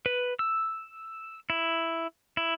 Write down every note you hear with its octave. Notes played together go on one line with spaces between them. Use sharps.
B4
E6
E4
E4